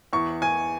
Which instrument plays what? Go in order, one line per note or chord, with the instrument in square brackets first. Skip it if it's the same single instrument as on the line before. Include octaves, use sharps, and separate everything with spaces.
[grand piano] E2 C#6
G#5